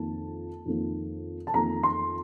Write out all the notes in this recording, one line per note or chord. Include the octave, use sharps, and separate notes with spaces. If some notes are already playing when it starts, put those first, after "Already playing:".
Already playing: F2 D#3 A#3 A5
F2 D#3 A#3
A5
F2 D#3 A#3 A#5
C6